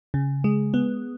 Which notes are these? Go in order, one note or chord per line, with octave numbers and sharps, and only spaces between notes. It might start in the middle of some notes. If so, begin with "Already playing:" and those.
C#3
G#3
B3